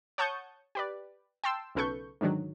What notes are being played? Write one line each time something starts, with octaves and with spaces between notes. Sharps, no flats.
C#5 F#5 A5 C#6 D#6 G6
G4 B4 D5
G5 A5 C6 E6
B1 C#3 A4 B4 C#6 G6
G#2 D3 D#3 F#3